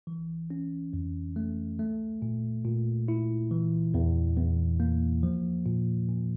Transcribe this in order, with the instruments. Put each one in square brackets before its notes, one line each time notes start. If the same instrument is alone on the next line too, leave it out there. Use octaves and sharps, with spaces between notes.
[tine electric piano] E3
C#4
F2
A3
A3
A#2
A#2
E4
E3
E2
E2
A#3
F3
A#2
A#2